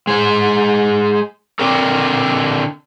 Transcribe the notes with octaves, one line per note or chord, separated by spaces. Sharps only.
G#3 C5
D3 C4 D4 A4 A#4